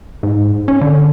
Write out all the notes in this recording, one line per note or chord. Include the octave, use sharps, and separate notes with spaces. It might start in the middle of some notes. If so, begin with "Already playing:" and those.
G#2
C#4
D3